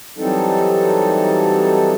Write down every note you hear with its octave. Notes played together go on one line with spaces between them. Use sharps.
E3 F#3 G3 C4 D#4 A4